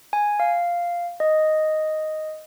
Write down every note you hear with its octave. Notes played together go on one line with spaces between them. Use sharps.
G#5
F5
D#5